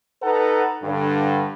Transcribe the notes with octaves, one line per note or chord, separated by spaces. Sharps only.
D#4 A4 B4 F#5 A#5
G2 D3